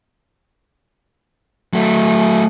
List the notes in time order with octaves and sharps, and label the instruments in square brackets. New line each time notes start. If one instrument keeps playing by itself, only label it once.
[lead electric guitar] F#3 A3